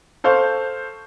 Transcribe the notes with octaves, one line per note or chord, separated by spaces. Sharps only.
A4 C5 F5 C#6 G6